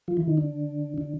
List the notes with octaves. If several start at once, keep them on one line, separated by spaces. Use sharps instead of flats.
F3 F4
E3 E4
D#3 D#4
D3 D4
D3 D4